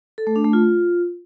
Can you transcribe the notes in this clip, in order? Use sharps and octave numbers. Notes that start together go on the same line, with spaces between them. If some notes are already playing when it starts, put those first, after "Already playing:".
A4
A3
D4
A3
F4